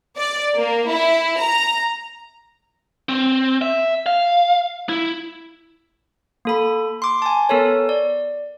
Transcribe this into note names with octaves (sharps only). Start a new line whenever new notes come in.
D5
A#3
E4
A#5
C4
E5
F5
E4
A#3 A4 B5
C6 D6
G#5 A5
B3 A4 A#4 C#5
D5